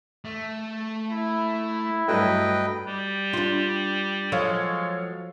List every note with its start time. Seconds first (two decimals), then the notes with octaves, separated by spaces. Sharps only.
0.25 A3
1.11 E4
2.08 G2 F#3 A3 B4 D#5 G5
2.87 G3
3.33 D4 F4
4.32 F3 F#3 G#3 A4 C#5 F5